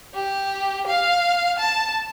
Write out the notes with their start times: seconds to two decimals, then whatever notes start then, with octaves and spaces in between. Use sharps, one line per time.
0.14 G4
0.86 F5
1.59 A5